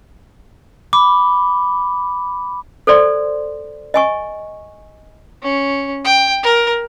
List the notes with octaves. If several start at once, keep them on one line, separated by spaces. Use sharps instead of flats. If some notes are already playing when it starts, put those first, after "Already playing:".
B5 D6
A4 C5 D5 C6
D#5 G#5 C#6
C#4
G5
A#4